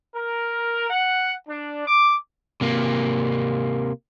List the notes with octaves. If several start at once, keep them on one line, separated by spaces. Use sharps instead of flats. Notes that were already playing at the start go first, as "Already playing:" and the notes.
A#4
F#5
D4
D6
C3 A#3